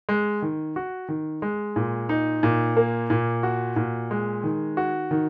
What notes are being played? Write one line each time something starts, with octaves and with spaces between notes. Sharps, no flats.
G#3
D#3
F#4
D#3
G#3
A#2
D#4
A#2
A#3
A#2
F#4
A#2
G#3
D#3
F#4
D#3